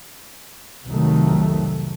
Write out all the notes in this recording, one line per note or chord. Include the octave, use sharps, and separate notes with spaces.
C2 F2 C3 D#3 F#3 A3